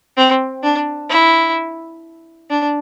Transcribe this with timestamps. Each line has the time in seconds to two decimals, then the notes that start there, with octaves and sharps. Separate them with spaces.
0.17 C4
0.63 D4
1.10 E4
2.50 D4